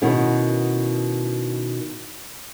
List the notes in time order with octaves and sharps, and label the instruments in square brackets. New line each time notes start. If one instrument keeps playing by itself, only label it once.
[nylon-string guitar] B2 D#3 B3 C#4 E4